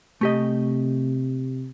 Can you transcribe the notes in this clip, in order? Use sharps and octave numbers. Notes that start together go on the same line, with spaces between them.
C3 A3 G4 D#5